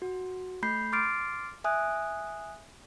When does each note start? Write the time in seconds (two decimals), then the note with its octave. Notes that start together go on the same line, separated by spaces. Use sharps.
0.02 F#4
0.62 A3 B5 G6 C7
0.92 C6 D6 F6 A6 C7 D7
1.64 E5 G#5 D#6 F#6